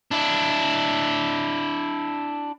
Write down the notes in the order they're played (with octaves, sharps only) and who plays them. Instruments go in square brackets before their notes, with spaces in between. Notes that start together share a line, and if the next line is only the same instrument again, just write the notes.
[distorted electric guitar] D4 E4